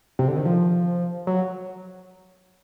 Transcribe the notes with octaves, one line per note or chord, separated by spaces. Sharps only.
C3
D3
D#3
F3
F#3